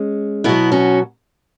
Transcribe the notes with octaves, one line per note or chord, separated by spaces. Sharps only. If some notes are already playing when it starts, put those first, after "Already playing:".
Already playing: G#3 C#4
B2 F#3 B3 E4
C#4 F#4